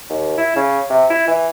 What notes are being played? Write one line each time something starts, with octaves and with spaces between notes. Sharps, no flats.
D#2
E4
C#3
C3
E4
E3